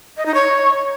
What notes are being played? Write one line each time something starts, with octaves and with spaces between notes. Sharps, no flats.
D#5
D#4
C#5